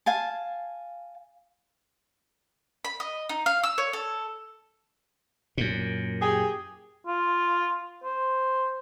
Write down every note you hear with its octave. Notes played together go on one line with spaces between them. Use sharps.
F5 G#5 A5
B5
D#5
D#4
F5
E6
C#5
A4
F#2 A#2
G4 G#4
F4
C5